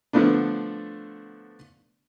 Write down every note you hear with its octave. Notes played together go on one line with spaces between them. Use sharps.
D3 F3 A3 B3 D4